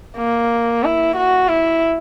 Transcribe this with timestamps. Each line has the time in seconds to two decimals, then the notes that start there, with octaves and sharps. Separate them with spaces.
0.17 A#3
0.84 E4
1.16 F#4
1.48 E4